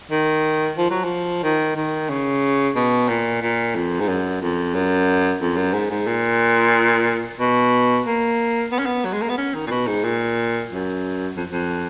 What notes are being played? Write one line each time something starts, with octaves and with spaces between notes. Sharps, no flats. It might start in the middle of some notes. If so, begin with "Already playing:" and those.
D#3
F3
F#3
F3
D#3
D#3
C#3
B2
A#2
A#2
F2
G#2
F#2
F2
F#2
F2
F#2
G#2
G#2
A#2
B2
A#3
B3
C#4
B3
F#3
G#3
A#3
B3
C#4
D#3
A#2
B2
G#2
A#2
F#2
F2
F2